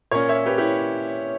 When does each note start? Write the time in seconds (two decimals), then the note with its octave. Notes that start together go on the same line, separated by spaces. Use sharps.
0.11 A#2 A#3 C#4 A#4 C#5
0.29 C#5 E5
0.46 G4 B4
0.58 E4 G4